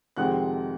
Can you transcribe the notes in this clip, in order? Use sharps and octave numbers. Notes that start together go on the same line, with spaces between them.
F2 C3 D#3 G#3 C4 F#5 F#6